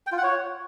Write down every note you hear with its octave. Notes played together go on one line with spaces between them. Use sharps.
G5
F4
F#5
C#5